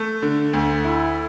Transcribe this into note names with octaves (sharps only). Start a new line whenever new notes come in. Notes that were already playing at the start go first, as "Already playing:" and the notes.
Already playing: A3
D3
D2
E4